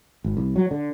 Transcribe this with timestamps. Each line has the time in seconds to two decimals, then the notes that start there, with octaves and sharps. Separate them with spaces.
0.24 G#1
0.37 C2
0.56 F#3
0.71 D3